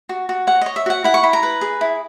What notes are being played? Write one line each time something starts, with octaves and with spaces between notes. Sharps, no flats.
F#4
F#4
C#5 F#5
C#5 D#5
E5
F#4 F#5
E4 F#5
C#6
E4 B5
A#5
B4
G#4
E4